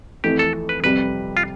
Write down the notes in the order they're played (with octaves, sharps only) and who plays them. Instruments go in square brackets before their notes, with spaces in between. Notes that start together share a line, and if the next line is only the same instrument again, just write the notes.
[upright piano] F2 E3 A3 [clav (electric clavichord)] G4
[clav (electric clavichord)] A4
B4
[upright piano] F2 C3 G3 [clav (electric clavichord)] B4
[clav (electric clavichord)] F4